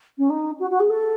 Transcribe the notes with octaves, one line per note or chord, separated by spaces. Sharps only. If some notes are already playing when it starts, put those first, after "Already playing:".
C#4
D#4
F#4
F#4
G#4
A4